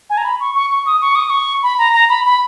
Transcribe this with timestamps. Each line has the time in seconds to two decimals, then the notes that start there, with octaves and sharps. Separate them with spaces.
0.10 G#5
0.17 A#5
0.25 B5
0.40 C#6
0.55 C#6
0.71 C#6
0.86 D#6
1.01 C#6
1.15 D#6
1.30 C#6
1.63 B5
1.78 A#5
1.94 A#5
2.09 B5
2.25 B5